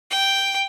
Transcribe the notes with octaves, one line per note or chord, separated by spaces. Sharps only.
G5